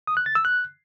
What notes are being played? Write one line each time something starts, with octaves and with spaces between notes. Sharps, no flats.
D#6
F#6
A6
E6
F#6